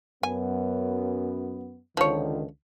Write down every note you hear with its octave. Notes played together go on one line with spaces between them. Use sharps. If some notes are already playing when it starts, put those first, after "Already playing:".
F#2 B3 G#5
C#2 D3 D#3 F3 C#5